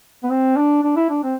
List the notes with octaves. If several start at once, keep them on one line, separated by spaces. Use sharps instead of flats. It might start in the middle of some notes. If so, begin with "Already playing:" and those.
B3
C4
D4
D4
E4
D4
C4